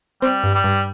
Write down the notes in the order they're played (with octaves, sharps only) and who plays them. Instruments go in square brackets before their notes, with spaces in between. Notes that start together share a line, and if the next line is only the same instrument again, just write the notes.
[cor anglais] G3 [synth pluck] C4
[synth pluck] G2
[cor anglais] G3
[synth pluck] G2